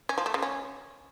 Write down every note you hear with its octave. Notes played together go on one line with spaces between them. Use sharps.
C#4
F3
A3
C#3
C#4